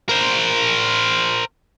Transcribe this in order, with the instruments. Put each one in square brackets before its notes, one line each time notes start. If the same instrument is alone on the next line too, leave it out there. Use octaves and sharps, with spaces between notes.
[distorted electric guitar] A#4 C5